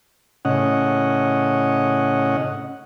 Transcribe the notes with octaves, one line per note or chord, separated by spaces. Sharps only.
A2 C#3 C#4 D#5 F#5